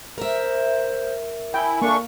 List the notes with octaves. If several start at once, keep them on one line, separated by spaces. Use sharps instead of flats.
A#4 C5 E5
E4 G5 G#5
A3 A#3 D4 C#6